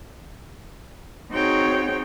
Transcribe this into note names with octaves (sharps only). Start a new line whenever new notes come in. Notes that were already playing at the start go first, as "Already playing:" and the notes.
C4 D#4 F#4 G#4 C#5 G5